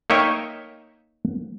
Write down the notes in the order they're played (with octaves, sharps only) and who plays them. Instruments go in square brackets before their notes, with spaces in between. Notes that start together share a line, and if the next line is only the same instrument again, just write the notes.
[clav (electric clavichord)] A#3 D#4 C#5 E5 G5